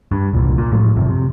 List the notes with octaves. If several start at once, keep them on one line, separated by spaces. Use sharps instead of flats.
G2
E1 C2 A#2
A#2
A2 F3 F#3 G#3
G#1 F#2 C3 F3
C3